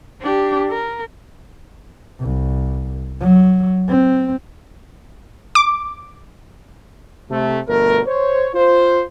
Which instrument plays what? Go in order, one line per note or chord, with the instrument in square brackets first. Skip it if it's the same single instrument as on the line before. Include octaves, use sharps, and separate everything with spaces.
[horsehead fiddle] D4 G4
A#4
[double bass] C2
F#3
C4
[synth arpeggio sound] D6
[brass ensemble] C3 A3
G1 B2 A3 A#4
C5 C#5
F4 C5